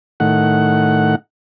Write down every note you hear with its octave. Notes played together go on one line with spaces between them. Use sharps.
A2 D#3 F#5